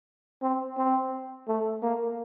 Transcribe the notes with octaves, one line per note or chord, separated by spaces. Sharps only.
C4
C4
A3
A#3